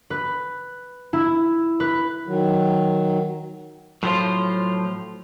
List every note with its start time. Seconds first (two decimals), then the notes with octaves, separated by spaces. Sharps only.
0.10 B4
1.13 E4
1.80 B4
2.27 D#3 F#3
4.03 A2 F3 F#3 F4 C5